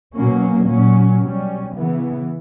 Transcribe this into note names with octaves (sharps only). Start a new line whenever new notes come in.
B2 F#3 A#3 C#4
A#2 F#3 C#4
B2 G3 C#4
C#3 E3 B3